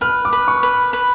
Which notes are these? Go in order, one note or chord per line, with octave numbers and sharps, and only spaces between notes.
B4 F6
D6
B4
C#6
B4
B4